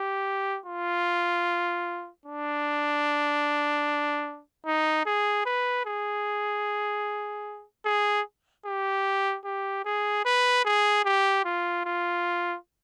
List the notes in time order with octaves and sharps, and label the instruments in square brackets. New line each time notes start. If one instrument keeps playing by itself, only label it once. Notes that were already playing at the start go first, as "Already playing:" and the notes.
Already playing: [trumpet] G4
F4
D4
D#4
G#4
B4
G#4
G#4
G4
G4
G#4
B4
G#4
G4
F4
F4